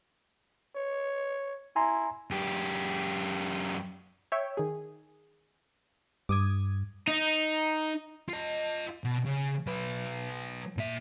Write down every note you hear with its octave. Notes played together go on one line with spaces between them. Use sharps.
C#5
E4 G#5 A#5 C6
F#2 G4
C#5 E5 G5
D#3 G#4
G2 D6 D#6 G#6
D#4
F4 D#5
B2
C#3
F#3 B4
A#2 E5